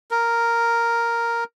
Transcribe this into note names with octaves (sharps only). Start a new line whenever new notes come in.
A#4